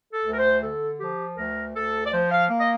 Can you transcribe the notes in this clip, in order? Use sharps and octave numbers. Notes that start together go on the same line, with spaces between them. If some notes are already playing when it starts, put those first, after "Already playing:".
A4
D2
A#4
C5
D3 A4
F3 G4
D2 A#4
D2 A4
D5
F3 C5
F5
A#3
D#5